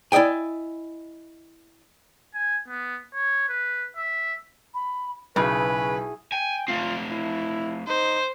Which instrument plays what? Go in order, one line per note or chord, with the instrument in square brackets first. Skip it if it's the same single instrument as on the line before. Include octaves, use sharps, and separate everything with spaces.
[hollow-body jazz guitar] E4 D5 D#5 G5 G#5
[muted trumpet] G#5
B3
C#5
B4
E5
[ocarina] B5
[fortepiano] B1 [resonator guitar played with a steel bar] C#3 [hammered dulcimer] E4 F#4 G#4 [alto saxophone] B4
[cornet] G5 [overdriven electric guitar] G#5
[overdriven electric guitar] A3 C4 [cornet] F4
[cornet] E4
[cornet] D#4 [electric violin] C5